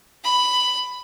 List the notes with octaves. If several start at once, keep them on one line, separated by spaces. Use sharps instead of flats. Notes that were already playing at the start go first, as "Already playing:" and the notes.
B5